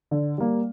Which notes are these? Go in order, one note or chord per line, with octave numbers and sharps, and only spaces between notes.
D3
G3 A#3